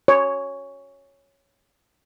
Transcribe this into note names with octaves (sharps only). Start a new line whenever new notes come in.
C#5